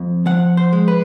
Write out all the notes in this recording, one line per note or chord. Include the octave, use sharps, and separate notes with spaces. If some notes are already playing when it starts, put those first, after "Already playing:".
Already playing: F2
F3 F#5
C5
G#3
B4